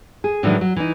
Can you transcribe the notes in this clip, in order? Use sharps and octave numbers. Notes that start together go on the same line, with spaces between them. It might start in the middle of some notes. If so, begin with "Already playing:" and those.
G#4
A2 D#3 E3 F#3 G#3 D4
F#3
E3 D#4